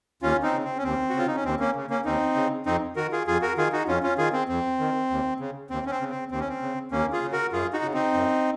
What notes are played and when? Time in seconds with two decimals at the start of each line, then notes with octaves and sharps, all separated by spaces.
0.22 D#2 C#4 F4
0.43 C4 D#4
0.54 C#3
0.64 C4
0.78 C#4
0.84 D#2 C4
1.09 F#4
1.14 C#3 F4
1.27 D#4
1.35 C#4
1.45 D#2 C4
1.60 A#3 C#4
1.76 C#3
1.90 A#3 C#4
2.05 D#2 C4 D#4
2.36 C#3
2.66 F2 C4 D#4
2.96 D#3 F#4 A#4
3.12 F4 G#4
3.27 F2 F4 G#4
3.42 F#4 A#4
3.57 D#3 F4 G#4
3.72 D#4 F#4
3.88 F2 C#4 F4
4.03 C#4 F4
4.18 D#3 F4 G#4
4.33 C4
4.49 F2 C4
4.79 D#3
5.10 D#2
5.40 C#3
5.70 D#2 C4
5.86 C#4
5.90 C4
6.01 C#3
6.10 C4
6.31 D#2 C4
6.40 C#4
6.48 C4
6.62 C#3
6.92 D#2 A#3 C#4
7.13 F4 G#4
7.22 C#3
7.32 F#4 A#4
7.52 F#2 F4 G#4
7.73 D#4 F#4
7.83 C#3
7.94 C4 D#4
8.14 F#2